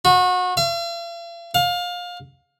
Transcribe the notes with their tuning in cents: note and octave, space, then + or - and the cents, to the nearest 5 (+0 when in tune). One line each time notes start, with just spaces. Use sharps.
F#4 -30
F5 -45
F5 +25